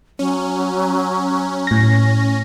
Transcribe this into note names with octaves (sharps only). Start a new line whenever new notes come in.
F#3 C#4
A2 A#6